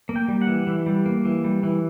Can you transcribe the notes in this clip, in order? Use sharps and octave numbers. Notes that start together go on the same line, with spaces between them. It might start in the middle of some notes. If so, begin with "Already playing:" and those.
A#3
G5
G3
F#5
E3
E3
G3
A#3
E3
G3
E3